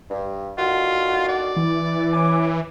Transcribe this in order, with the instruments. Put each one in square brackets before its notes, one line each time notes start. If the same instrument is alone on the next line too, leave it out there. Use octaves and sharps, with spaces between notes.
[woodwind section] G2
[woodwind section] D3 D#3 F#4 [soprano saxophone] F4
[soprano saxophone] D5
[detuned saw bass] E3
[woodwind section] C#4 G#5 D6